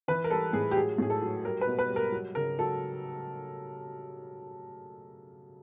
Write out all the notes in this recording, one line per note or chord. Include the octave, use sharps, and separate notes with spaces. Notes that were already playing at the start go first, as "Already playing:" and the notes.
E3 B4
A#4
G3 A4
A2 G#4
G4
F#3 G#4
A2 G#4
A4
F#3
G3 A#4
B4
B2
B4
G3
A#4
F#3
C#3 A#4
F#3 A4